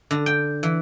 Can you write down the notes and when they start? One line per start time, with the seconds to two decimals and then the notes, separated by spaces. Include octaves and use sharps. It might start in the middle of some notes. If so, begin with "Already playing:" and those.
0.11 D3
0.26 G5
0.63 E3